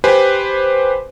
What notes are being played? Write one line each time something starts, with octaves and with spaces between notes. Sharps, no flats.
G4 B4 C5 G#5